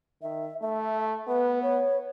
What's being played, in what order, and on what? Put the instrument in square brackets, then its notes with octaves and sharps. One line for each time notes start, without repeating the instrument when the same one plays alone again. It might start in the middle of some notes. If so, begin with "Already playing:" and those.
[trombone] D#3 [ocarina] E5
[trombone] A3 [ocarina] E5
[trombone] B3 [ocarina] B4
[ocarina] C#5